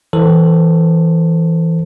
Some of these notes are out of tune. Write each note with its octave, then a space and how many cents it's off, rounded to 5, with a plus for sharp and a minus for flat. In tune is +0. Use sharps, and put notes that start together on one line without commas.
E3 +0 A4 +20 C5 +0